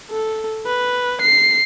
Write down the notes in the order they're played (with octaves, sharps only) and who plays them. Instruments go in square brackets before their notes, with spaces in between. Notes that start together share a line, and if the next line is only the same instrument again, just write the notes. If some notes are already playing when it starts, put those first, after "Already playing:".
[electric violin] A4
B4
C7